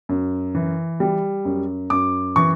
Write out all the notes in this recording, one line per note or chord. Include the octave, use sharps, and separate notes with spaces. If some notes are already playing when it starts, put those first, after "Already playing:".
F#2
E3
G3
F#2
F#2 D6
E3 C#6